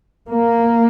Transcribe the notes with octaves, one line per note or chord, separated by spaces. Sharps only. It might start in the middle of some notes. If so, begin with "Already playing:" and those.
A#3